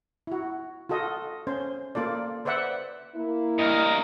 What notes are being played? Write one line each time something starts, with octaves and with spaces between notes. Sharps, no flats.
E4 F#4
F4 F#4 A4 D#5
C#4 C5
A#3 F4 A4 D5
B4 C5 D5 E5 F#5
A#3 E4
G2 A#4 D#5